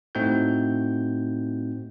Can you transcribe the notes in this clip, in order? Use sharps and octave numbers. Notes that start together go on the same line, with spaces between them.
A2 A3 C4 D#4 F#4 G6